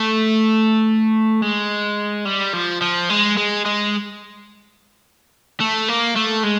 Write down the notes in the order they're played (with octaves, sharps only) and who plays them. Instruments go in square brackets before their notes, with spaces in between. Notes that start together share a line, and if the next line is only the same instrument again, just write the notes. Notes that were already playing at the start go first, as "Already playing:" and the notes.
Already playing: [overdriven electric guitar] A3
G#3
G3
F3
F3
G#3
G#3
G#3
A3
A#3
A3
G#3